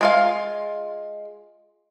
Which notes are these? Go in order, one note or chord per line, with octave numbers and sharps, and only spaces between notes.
G#3 F4 F5